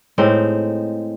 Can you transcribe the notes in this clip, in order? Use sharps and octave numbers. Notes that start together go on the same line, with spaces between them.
A2 G#3 C4 D#4